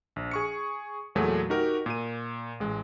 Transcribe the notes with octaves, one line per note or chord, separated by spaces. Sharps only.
A#1
G#4 C#6 C#7
E2 A#2 F#3 A3 G#4
D#4 F#4 G4 A#4
A#2 D#7
A1 G#3